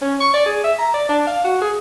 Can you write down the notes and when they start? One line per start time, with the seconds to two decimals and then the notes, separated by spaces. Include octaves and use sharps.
0.01 C#4
0.21 C#6
0.33 D5
0.46 G#4
0.64 E5
0.79 A#5
0.94 D5
1.09 D4
1.27 F5
1.44 F#4
1.62 G#4